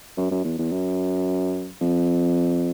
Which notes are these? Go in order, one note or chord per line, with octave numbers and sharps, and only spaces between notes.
F#2
F#2
E2
E2
F#2
F2